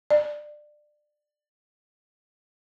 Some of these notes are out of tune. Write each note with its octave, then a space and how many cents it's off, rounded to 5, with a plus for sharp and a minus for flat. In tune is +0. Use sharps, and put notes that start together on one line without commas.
D5 +25